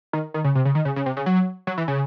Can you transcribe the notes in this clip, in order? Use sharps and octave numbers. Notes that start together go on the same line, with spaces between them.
D#3
D#3
C#3
C3
C#3
D#3
C#3
C#3
C3
C#3
F#3
F#3
E3
C#3